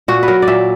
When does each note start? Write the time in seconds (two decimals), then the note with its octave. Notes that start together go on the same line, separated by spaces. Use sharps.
0.08 A#2 F#4
0.23 B4
0.28 F#3 A#4
0.42 D5
0.48 A#2 E5